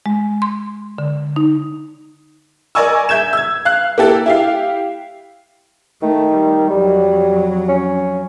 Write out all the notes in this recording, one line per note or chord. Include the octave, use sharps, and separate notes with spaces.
G#3
C6
D3
D#4
A#4 D5 D#5 G#5 C#6 E6
E5 G6 G#6 E7
E6 G#6
F5 F#6
A#3 E4 G4 A4
E4 G4 F5
D#3 A3
G3
F2 F#3 G3
C#4